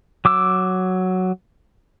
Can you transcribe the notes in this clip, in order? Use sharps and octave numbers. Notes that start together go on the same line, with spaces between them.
F#3 D6 E6